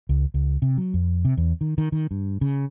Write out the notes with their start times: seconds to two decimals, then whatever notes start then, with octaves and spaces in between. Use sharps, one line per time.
0.09 C#2
0.34 C#2
0.62 C3
0.78 F#3
0.94 F2
1.25 C3
1.37 E2
1.61 D#3
1.78 D#3
1.92 D#3
2.11 G2
2.41 C#3